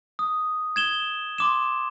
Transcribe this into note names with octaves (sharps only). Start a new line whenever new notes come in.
D#6
G#6 E7 G7
C6 D6 E7